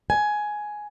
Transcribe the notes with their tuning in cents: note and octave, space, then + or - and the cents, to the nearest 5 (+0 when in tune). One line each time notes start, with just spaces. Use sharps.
G#5 +10